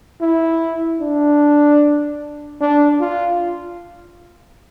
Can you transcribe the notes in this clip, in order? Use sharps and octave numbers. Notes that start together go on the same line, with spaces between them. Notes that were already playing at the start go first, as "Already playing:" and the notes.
E4
D4
D4
F4